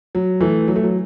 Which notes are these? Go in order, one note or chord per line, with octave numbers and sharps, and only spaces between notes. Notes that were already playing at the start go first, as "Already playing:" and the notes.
F#3
E3 A3
F#3
A3
F#3